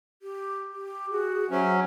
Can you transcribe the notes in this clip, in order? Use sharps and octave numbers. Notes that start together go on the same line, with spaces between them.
G4
G4
F#4 G#4
F#3 C#4 C5 E5